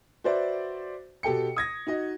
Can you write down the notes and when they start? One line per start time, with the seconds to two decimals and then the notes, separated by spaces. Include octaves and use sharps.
0.24 F#4 B4 C5 D5 E5
1.23 B2 G4 A4 G5 C#7
1.56 D#6 G#6 A#6
1.87 D#4 F#4 D#5